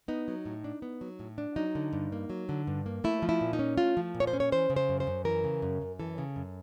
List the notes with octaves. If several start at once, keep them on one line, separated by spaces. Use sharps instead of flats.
B3 D#4
F#3
A2
D4
B3
F#3
A2
D4
F#3 D#4
D3
G2
A#3
F#3
D3
G2
A#3
A3 E4
F3
E4
A#2
D#4
C#4
A3 F4
F3
A#2
C#5
C5
C#4
C#5
E3 C5
C#3
C5
F#2
C5
F#2
E3 A#4
C#3
F#2
F#2
E3 A4
C#3
F#2